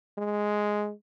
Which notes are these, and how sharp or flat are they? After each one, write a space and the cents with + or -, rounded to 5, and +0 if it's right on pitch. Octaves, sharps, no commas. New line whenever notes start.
G#3 +0